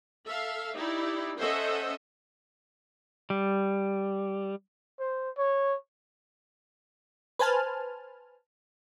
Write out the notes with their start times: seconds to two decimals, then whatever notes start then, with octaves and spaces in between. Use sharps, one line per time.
0.25 A4 E5 F5
0.76 D#4 E4 G4 D5
1.38 C#4 A4 C5 D#5 E5 F#5
3.30 G3
5.00 C5
5.38 C#5
7.39 B4 C5 G#5 A5 F6